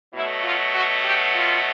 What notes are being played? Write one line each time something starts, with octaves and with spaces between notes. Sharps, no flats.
B2 F#3 A3 E4
F4
F#4
G4
F4